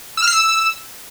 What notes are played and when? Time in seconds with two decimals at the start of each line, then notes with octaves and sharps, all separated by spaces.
0.17 E6
0.22 F6
0.27 C7
0.33 E6